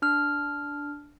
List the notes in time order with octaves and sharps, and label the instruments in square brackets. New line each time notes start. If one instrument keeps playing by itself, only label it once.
[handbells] D4 F6